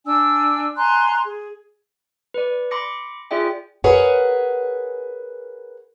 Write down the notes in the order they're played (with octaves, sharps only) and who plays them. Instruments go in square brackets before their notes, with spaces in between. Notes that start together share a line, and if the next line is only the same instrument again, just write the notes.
[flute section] D4 G#5 E6
G#5 A#5 C6 F#6
G#4
[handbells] B4 D5
B5 C6 D6 A#6 C#7
F4 G#4 D5 E5 G5
[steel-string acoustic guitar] G#4 A#4 B4 C#5 F#5 G#5